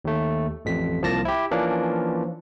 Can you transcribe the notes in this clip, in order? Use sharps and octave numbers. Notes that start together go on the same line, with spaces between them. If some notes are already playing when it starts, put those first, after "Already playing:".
D#2 A3
A1 F2 B6
C2 F3 A#3 A5 A#6
E4 G4
E3 F3 A#3 C#4 D4